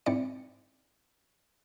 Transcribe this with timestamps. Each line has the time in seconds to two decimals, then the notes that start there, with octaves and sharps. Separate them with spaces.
0.06 G#2 C4 E4 D5 C#7